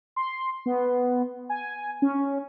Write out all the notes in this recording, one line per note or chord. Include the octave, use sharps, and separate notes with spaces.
C6
B3
G#5
C#4